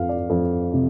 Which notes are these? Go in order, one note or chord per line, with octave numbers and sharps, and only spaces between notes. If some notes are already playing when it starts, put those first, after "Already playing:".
Already playing: F2 F3 F5
D5
F2
C3